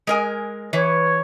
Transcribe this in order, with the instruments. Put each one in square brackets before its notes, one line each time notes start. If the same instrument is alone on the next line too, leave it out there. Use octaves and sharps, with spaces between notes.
[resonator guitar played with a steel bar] G#3 A#4 G#5
[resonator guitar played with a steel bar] E3 [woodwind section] B4 C#5